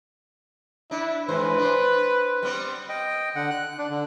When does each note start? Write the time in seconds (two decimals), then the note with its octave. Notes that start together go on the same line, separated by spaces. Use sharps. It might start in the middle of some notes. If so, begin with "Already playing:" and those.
0.91 D4 E4
1.29 G#2 E3 B4 C5
1.58 D4 C5
2.43 G3 B3 C4
2.89 D#5 G5
3.36 D3 F#5
3.50 F#6
3.78 D4
3.90 D3